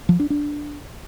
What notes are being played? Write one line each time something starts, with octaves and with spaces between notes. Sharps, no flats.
F3
D4
D4